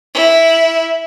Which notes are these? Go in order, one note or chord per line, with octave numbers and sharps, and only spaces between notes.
E4